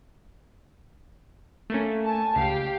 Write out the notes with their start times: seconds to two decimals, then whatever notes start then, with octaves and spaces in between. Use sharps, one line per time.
1.70 A3 A#3 C#4
2.04 G#5 A5
2.36 C#2 G4 F5 G5